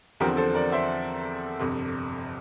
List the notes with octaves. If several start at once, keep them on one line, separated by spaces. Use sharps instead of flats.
E2 D3 F3 C4 G4 A#4
A4 C5
A#4 D5
C5 E5
G1 F2 C3